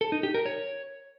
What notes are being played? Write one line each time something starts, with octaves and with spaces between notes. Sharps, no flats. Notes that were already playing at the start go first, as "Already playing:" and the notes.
A4
D#4
G4
A#4
C#5